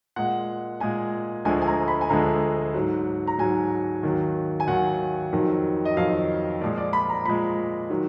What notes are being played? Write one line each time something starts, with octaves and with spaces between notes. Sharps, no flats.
A#2 G#3 F#5
A#2 G#3 G#5
D2 D3 F3 G#3 G#5
G#5
A#5
B5
G#5
D2 D3 F3 G#3 A#5
G#2 F#3
A#5
G#2 F#3 G#5
D#2 D#3 F#3
G#5
D#2 D#3 F#3 F#5
F2 D#3 F#3
D#5
F2 D#3 F#3 F5
A#2 F3 G#3 D5
D5
B5
A#5
A#2 F3 G#3 B5
D#3 F#3